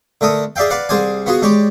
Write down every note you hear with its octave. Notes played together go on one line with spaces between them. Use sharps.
D3 A3 A#4 D#6
G#4 D5 E5 F5 G5
B4 D5 F5 F#5
C2 G#4 C5 D5 G#5
B3 F4 F#4 G#4
G#3 G4 C#5 D5